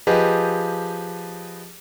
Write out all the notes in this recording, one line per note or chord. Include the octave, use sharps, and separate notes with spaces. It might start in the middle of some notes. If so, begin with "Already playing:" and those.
F3 G4 G#4 B4 D#5